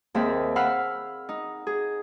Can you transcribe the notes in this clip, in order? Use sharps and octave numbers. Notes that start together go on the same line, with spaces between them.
D#2 A#3 C4 G#4 E5
F5 F#5 B5 E6 F6
D#4
G#4